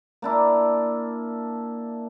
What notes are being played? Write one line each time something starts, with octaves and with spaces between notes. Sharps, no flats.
A#3 D4 E4